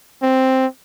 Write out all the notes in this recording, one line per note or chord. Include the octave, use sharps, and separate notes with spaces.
C4